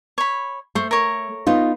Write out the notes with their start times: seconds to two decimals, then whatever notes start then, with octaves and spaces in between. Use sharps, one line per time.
0.18 C#5 B5
0.75 A3 C5 C#6
0.91 A#4 C#5
1.47 B3 D#4 F4